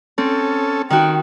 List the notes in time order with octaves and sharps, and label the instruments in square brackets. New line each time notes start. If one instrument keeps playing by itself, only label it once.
[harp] C4 [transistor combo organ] C#4 A4
[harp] D#3 F#4 [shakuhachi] G5